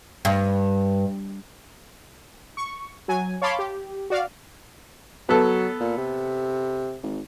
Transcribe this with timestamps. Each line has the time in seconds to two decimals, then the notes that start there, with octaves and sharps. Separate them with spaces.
0.25 G2
2.57 C#6
3.08 F#3 G#5
3.42 C#5 F5 A5 B5 C6 D6
3.59 G4
4.10 F#4 D5 F5
5.29 F#3 B3 A4
5.80 A#2
5.97 C3
7.03 G#1